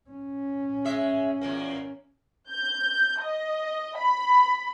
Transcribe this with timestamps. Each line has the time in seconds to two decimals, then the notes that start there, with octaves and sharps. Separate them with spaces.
0.10 C#4
0.85 G#3 E5
1.41 E2 A#2 A#3
2.51 G6
3.21 D#5
3.96 B5